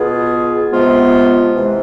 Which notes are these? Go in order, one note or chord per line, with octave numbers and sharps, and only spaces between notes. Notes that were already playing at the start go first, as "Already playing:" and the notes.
Already playing: B2 B3 F4 G#4
C3 F3 G#3 B3 F4
C3 E3 G#3